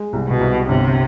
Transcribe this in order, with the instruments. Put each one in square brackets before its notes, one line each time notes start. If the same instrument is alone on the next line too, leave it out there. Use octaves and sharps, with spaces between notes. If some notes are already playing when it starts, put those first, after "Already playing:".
Already playing: [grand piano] G#3
C2
[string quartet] B2
[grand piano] C2
[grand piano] G1 [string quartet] C3